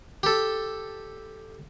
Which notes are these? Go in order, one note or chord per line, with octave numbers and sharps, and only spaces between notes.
G4 A4